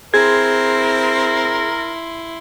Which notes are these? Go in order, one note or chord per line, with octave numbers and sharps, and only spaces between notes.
C4 E4 G#4 A#4 C6 G#6